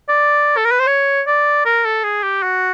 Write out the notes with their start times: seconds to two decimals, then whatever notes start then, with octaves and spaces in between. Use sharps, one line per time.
0.09 D5
0.57 A4
0.65 A#4
0.71 B4
0.80 C5
0.87 C#5
1.27 D5
1.65 A#4
1.85 A4
2.04 G#4
2.23 G4
2.43 F#4